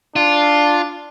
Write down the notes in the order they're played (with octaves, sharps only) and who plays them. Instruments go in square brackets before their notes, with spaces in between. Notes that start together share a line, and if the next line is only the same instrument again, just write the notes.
[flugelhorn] D4 [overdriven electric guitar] F4